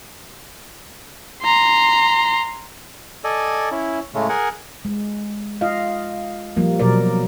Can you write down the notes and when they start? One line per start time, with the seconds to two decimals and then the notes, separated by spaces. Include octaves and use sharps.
1.43 A#5 C6
3.24 A4 D5 D#5 G#5
3.71 C#4 E4
4.14 A2 C#3 G#3 A3 C#4
4.29 G#4 A#4 F#5 G#5
4.85 G#3
5.61 F4 D#5 F5
6.57 F3 G3 A#3
6.79 B2 F#3 A#3 A#4 D5